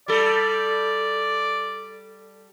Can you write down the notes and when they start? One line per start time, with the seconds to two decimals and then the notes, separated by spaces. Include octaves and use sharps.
0.08 G3 A4 D5